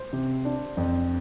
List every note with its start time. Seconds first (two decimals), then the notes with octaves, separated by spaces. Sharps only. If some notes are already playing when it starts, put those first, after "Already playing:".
Already playing: C5
0.13 C3
0.45 D4
0.77 F2